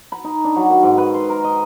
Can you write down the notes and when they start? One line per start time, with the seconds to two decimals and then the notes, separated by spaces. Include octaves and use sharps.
0.12 B5
0.24 D#4
0.44 D4
0.56 F#3
0.70 D#3
0.83 G#2
0.98 B4
1.14 C6
1.29 A#4
1.44 D#5